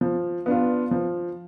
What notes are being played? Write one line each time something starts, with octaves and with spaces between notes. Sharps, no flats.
F3
B3 D4 F4
F3